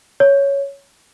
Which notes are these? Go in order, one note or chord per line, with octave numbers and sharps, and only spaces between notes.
C#5